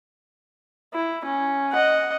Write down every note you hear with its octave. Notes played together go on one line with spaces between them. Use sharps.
E4
C#4
D#5 F#5